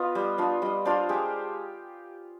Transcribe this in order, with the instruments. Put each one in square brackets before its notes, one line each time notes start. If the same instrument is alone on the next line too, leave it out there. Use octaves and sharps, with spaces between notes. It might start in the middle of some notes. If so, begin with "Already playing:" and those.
Already playing: [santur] B3 F4 D#5
G3
D4 F4
G3 D#5
D4 F4 C5
G#3 G4